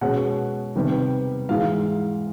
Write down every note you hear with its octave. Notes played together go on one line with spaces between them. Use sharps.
B2 G#3 C#4 F#5
C3 D#3 G3 B3
G#2 E3 G#3 F5